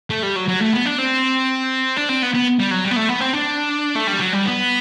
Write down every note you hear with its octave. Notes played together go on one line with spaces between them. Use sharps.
A3
G3
F#3
F#3
A3
B3
D4
C4
D4
C4
B3
B3
G3
F#3
G3
B3
A3
B3
C4
D4
A3
G3
F#3
G3
B3